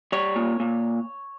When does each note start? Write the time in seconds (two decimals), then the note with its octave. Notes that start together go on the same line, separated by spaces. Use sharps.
0.12 G3 C#5
0.36 A#2
0.60 A#2